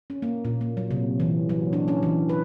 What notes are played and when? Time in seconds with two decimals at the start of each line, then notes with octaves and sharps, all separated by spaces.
0.10 C#4
0.22 A#3
0.45 A#2
0.61 A#3
0.77 F#3
0.91 C3
1.20 E3
1.49 F#3
1.73 D4
1.88 C#4
2.03 E3
2.29 B4